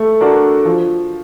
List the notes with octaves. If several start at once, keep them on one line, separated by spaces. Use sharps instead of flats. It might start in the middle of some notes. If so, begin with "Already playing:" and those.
Already playing: A3
D4 F#4 A#4
F3